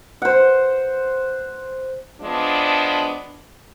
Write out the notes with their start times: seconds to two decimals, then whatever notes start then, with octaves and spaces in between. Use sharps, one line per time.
0.22 C5 F#5
2.21 F3 G#3 B3 D4